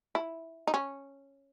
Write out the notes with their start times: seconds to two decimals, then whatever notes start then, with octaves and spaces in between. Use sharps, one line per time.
0.15 E4
0.67 D#4
0.74 C#4